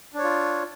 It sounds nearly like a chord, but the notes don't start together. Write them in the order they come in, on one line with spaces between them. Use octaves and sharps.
D4 C#5 F4